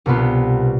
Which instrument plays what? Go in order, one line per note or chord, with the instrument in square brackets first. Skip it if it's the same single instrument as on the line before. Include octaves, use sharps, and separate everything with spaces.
[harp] C2 B2 B3 F4